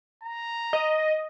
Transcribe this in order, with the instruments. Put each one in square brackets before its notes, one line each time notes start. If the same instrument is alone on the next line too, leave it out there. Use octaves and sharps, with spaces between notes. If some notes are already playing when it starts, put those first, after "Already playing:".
[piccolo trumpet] A#5
[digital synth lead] D#5